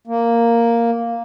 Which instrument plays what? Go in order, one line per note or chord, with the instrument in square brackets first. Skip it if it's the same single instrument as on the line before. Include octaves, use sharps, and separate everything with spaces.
[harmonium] A#3